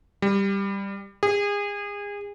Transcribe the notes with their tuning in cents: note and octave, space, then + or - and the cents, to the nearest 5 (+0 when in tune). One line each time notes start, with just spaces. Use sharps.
G3 +10
G#4 -30